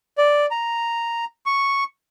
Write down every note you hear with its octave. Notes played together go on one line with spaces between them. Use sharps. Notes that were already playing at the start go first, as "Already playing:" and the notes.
D5
A#5
C#6